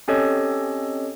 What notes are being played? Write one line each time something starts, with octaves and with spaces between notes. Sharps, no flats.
C4 C#4 G4 A4 C#5 D#5